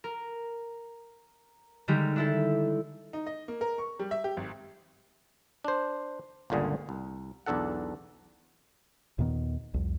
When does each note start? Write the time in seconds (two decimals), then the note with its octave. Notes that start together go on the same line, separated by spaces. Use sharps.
0.04 A#4
1.88 D3 D#3 G3 G#3 D#4 G4
2.16 D4 E4 A4
3.13 D#4
3.27 D#5
3.48 A#3
3.61 A#4
3.78 C#6
3.99 G3
4.11 E5
4.24 G4
4.37 G#1
5.64 D4 C5
6.50 G1 C#2 A#2 D3 G#4
6.89 C2
7.46 B1 E2 D4 A4 F#5
9.19 D#2 A#2 D#3 B3
9.74 C2 F2